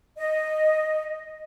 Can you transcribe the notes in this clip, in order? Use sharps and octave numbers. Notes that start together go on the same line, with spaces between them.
D#5